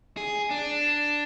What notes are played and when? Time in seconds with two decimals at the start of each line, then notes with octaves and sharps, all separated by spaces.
0.17 G#4
0.50 D4